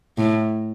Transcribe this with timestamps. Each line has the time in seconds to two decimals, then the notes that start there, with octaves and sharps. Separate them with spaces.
0.18 A2